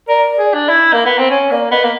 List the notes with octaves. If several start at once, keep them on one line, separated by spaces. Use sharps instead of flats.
A#4 D5
G#4
D4
E4
A#3
B3
C4
C#4 C#5
A#3 D5
B3 D#5
A#3